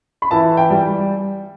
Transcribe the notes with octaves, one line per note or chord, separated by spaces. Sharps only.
B5
E3 A5
G5
G3